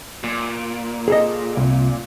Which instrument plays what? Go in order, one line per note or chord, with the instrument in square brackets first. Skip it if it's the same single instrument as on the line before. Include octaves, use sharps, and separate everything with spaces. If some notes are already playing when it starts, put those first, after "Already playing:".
[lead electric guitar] A#2
[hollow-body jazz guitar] G#4 A4 D#5
C2